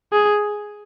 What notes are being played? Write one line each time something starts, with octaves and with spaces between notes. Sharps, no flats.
G#4